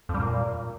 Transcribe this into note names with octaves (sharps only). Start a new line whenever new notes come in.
F2
G3
A#2